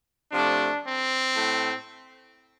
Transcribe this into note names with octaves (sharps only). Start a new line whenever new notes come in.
C3 F3 A3 D4
C4
A2 A3